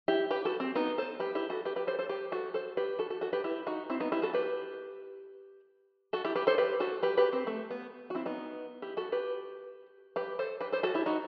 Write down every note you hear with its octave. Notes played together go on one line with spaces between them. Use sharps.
E4 G4
G4 B4
F#4 A4
C4
B3 D#4
A4 C5
G4 B4
E4 G4
F#4 A4
G4 B4
G4 B4
A4 C5
A4 C5
G4 B4
F#4 A4
A4 C5
G4 B4
F#4 A4
F#4 A4
F#4 A4
G4 B4
E4 G4
D#4 F#4
C4 E4
B3 D#4
E4 G4
F#4 A4
G4 B4
F#4 A4
E4 G4
G4 B4
A4 C5
G4 B4
F#4 A4
G4 B4
G4 B4
C4
A3
B3
F#4
C4 E4
B3 D#4
E4 G4
F#4 A4
G4 B4
G4 B4
A4 C5
G4 B4
A4 C5
F#4 A4
E4 G4
D#4 F#4